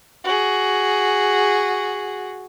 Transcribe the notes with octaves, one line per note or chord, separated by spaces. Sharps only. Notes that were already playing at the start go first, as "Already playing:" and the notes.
F#4 G#4